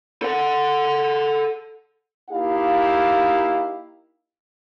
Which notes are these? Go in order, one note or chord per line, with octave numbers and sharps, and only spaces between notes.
A4 F#5
A#3 D#4 E4 G4 F5